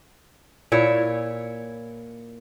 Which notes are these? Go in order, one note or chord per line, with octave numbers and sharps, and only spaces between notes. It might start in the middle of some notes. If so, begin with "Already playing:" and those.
A#2 E4 C#5